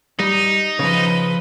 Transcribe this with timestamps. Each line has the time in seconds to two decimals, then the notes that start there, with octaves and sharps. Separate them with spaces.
0.20 G3 D#4
0.79 C#3 F3 B4 D#5